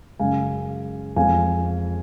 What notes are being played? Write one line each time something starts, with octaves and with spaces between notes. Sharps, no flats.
F#2 C#3 G#3 F5 G#5
F2 F3 G#3 F5 G#5